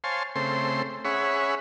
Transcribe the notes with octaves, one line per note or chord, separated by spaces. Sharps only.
C5 C#5 F5 G#5 A5 C6
C#3 A3 C4 C5 C6
C#4 G#4 C#5 E5 F#5 B5